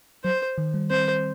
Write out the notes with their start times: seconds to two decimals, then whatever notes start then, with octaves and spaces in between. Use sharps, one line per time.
0.24 F#3 C5
0.58 D#3
0.74 G3
0.90 C4 C5